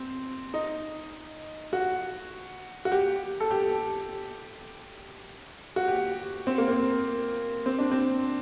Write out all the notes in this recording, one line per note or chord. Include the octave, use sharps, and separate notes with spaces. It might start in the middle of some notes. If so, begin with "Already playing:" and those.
Already playing: C4
D#4
F#4
F#4
G4
A4
G4
F#4
G4
C4
A#3
C4
C4
D4
C4